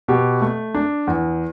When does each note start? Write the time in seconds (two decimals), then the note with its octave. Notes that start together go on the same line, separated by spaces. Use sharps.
0.08 B2 G4
0.41 A3
0.75 D4
1.07 E2